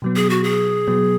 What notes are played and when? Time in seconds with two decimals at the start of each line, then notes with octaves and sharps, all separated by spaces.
0.02 B2 F#3 B3
0.16 G#4
0.30 F#4
0.44 G#4
0.87 B2 F#3 B3